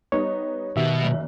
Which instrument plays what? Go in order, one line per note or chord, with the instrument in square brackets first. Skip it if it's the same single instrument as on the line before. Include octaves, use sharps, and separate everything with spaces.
[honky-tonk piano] G3 B3 D#4 [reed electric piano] C#5
[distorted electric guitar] B2 [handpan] D#3 [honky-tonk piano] G4 [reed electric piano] E5
[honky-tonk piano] F#1